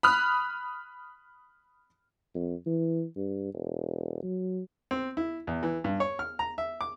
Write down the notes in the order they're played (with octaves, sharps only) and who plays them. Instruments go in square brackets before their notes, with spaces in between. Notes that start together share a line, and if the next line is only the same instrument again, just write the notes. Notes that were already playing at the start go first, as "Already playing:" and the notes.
[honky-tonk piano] B5 D#6 F6 F#6
[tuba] F2
E3
G2
E1
F#3
[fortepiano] C4
E4
E2
E3
G2
C#5
F6
A#5
E5
D6